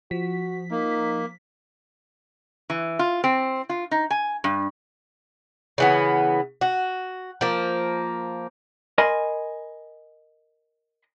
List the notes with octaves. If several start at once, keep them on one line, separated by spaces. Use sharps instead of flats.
F3 F#4 B6
A#3 D#4
E3
F4
C4
F4
D#4
G#5
G2
C#3 E3 B3
F#4
F3 A#3
A#4 D#5 G#5 B5 C6